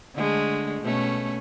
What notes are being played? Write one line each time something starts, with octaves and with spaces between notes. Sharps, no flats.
D3 G#3 A3
B2 A3 C#4